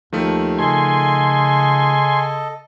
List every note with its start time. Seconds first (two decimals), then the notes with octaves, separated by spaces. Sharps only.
0.13 D#2 D#3 F3 A3
0.59 C#3 A4 D#5 G#5 C6